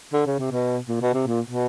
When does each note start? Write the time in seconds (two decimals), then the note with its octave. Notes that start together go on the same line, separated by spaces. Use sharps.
0.13 D3
0.27 C#3
0.39 C3
0.51 B2
0.89 A#2
1.01 B2
1.14 C3
1.27 A#2
1.46 B2